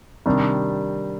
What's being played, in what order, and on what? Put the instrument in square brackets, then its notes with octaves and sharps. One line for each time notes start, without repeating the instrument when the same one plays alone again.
[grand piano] C3 D#3 G3 D4